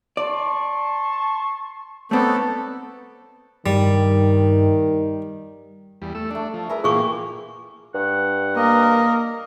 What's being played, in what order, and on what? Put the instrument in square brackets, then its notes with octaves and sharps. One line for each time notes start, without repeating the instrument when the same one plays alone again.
[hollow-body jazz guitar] D5 [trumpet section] A5 C6 C#6
[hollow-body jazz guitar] A3 C4 [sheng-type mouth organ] B3 A4 [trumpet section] D#4 C#5 D5
[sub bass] G2 [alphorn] D#3 [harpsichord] G3
[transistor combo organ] E2 G3
A3 E6
[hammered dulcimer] A3 A4 [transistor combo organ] D4
[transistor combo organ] F3
[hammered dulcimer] G#4 B4 E5 [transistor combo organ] A#4
[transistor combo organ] A#2 E3 A#3 [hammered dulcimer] F4 G4 [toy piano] G#4 C#6 D6
[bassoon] G2 [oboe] F#5
[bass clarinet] A#3 [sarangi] A#4 [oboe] D#5